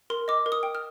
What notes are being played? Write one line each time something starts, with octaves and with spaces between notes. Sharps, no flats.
A#4 C6
D#5 D6
A#4
D#6
G5
F6